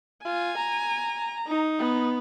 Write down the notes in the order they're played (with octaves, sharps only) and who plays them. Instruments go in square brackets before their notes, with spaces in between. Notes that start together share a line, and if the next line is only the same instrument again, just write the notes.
[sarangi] F4 [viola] G#5
[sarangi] A#5
[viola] D#4
[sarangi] B3